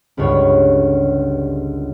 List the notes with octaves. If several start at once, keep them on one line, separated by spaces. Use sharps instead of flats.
G1 C#2 G2 C#5